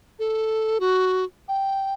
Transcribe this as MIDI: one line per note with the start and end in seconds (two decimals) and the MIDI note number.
0.19 0.78 69
0.80 1.24 66
1.48 1.94 79